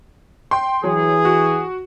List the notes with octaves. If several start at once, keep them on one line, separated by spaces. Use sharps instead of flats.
G5 C6
E3 F#3 G#4
F#4